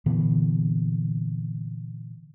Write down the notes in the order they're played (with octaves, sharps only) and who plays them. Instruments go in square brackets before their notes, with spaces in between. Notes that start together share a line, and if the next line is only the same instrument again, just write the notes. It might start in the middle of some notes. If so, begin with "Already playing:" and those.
[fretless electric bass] A#2 D3 E3 B3